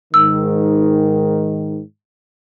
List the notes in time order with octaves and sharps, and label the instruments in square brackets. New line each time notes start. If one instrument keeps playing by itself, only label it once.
[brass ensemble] G#2 D#3 [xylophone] E6